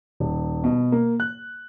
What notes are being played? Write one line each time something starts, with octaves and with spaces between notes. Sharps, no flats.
D#1
B2
A#3
F#6